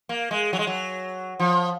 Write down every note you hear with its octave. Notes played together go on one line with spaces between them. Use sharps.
A#3
G#3
F#3
G#3
F#3
F3